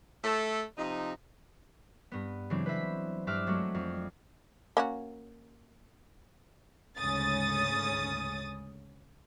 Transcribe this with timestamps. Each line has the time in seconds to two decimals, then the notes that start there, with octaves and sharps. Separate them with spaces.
0.24 A3 A4
0.78 C3 F3 D#4
2.12 G2 B3
2.50 C#3 E3 F#3 G#3 C4 D4
2.66 B4 C5 E5 B6
3.27 G2 C4 E5 D6 F6 F#6
3.46 F#3 G#3 A3 D4 F#4
3.74 F2
4.77 A#3 C#4 F#4
6.97 D2 G#2 C#3 C#4 D#6 A6